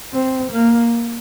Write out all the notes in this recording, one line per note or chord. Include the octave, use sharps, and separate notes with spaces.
C4
A#3